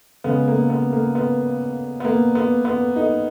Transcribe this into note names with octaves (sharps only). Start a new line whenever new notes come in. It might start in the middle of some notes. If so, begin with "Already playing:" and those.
C#3 G#3 B3
A#3
B3
A#3
B3
B3
A#3
B3
B3
D#4